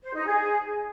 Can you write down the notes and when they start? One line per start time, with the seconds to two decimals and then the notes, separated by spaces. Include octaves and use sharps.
0.03 C5
0.14 D#4
0.26 G#4